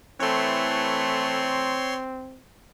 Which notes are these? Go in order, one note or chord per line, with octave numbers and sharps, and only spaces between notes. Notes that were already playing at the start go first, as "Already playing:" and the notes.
E3 A3 C4 C#5 C6